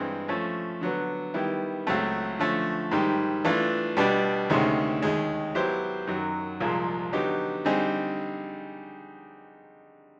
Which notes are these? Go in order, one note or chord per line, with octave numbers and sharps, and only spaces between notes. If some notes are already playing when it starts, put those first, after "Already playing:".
Already playing: G2 E3 G#3 C4
F3 A3 C#4
D3 F#3 B3
D#3 G3 B3 E4
C#2 C#3 F#3 A3 C4
D3 F3 A3 C#4
G#2 D#3 G3
E3 A3 D4 F4
B2 G3 B3 D4
D2 C3 D#3 G#3 C#4
D#2 D#3 G#3
F#3 B3 E4 G4 C5
F#2 D#3 F#3
C2 A#2 F3 G#3
D3 F#3 B3 D#4 G4
D3 G3 C4 D#4 G#4